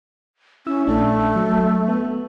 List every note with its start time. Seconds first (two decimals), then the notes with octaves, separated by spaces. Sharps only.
0.67 C#4 E4 E6
0.87 A#1 A3 D4
1.36 F#3
1.88 B3